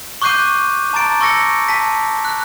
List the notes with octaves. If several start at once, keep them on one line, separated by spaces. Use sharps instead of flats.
C#6 D6 F#6 G6 C7 D#7
A5 A#5 D6 A6 D7
C#6 D6 E6 A#6 C#7
A5 B6
F#6